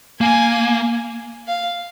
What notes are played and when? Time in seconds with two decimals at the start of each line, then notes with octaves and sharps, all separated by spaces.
0.21 A#3 G#5
1.48 F5